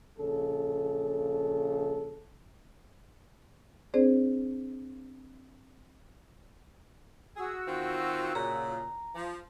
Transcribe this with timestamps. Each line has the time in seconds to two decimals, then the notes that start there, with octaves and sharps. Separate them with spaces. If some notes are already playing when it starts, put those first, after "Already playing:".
0.18 A#1 C#3 A4
3.94 C4 D4 G#4 C5 D5
7.37 F#4 G#4 E6
7.68 D#3 C4 F4
8.35 A#2 C#3 A#5
9.15 F3